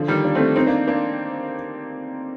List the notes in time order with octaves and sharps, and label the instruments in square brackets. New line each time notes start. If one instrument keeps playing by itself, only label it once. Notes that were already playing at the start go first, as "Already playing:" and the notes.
Already playing: [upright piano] D3 F3
D#3 G3
A#3 D4
A3 C4
C4 D#4
A#3 D4
A#3 D4